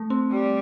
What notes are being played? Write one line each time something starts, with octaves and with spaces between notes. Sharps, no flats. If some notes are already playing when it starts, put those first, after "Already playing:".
Already playing: A3
C4
G3